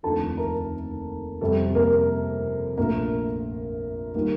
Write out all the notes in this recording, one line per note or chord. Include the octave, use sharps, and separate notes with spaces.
F1 D#2 D3 F3 A4 A5
A#4 A#5
F2 C3 G3 A4
A#3 A#4
A#1 A#2 A3 A#3 A#4
D#3 G3 A#3